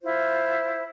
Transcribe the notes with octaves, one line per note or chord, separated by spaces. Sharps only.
E4 F4 C5